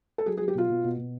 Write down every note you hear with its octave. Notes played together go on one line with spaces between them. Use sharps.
A4
F#3 G#4
G#4
F#3
G4
B2 F4
B2
B2
B2